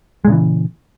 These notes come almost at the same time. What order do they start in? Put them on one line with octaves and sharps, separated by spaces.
G#3 A#2 C#3 E3